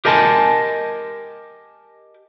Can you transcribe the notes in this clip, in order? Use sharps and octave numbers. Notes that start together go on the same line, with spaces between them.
G4 A#4 D#5 G#5 A5